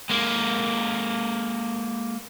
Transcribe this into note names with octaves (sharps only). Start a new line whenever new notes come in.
G#3 A#3